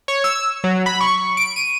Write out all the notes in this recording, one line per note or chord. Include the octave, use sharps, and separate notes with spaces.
C#5
E6
F#3
B5
C#6
D7
D#7